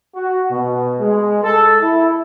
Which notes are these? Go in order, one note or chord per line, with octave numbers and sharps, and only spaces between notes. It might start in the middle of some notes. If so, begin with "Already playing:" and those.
F#4
B2
G#3
A4
E4